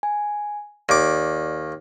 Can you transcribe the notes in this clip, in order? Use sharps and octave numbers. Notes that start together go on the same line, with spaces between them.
G#5
D#2 D5 D6